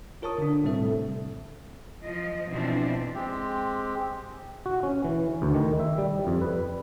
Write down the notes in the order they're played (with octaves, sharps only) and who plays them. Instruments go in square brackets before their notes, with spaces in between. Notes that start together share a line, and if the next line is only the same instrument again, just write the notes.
[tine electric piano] F4 A#4 C#5 A5 C#6 D#6
D3 D4
A2 C3 G3 C4 A4 E5
[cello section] F3 D#5
B2 E3 F3 C4 D4 E4
[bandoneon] G#3 C4 G4
[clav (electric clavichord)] F#4
C#4
E3
D2
D#3
E5
G3
F2
B4